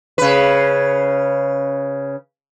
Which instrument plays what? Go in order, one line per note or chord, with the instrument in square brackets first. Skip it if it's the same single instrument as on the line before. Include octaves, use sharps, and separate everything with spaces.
[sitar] C#3 B4